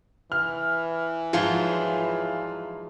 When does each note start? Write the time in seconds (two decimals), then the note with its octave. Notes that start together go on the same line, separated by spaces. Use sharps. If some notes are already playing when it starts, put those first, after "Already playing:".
0.32 E3 F6
1.33 G#2 F3 F#3 F4